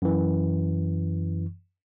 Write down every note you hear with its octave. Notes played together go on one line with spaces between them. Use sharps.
F#2 E3